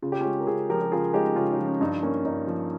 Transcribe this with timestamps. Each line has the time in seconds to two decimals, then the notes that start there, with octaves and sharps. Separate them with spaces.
0.02 C#3 F4
0.12 G4
0.21 C#4 F4
0.25 G#3
0.40 A#4
0.47 C#3 F4 G#4
0.69 F3 G4 A#4
0.82 G4
0.92 C#3 F4 G#4
1.13 G#3 D#4 G4
1.36 C#3 C#4 F4
1.51 D#4
1.58 F3
1.66 C#4
1.81 G2 D#4
2.03 A#3 C#4
2.24 G2 D#4
2.47 F3